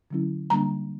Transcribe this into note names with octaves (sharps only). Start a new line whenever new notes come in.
D3 F#3 C#4 E4
D3 G3 A#3 D4 A#5